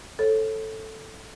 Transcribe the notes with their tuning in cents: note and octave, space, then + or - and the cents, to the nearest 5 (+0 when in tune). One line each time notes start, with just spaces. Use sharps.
A4 +0 C#5 -25